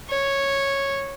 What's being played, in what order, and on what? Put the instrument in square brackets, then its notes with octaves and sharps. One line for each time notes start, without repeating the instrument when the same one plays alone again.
[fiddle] C#5